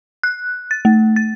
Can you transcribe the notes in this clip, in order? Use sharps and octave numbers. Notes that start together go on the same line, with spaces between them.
F#6
A6
A3
A6